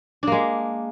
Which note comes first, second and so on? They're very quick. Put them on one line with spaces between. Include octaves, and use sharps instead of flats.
D4 A#3 G#3